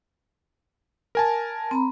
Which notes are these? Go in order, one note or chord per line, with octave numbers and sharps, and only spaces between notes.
A#4 G#5 A5
C4 A#5 B5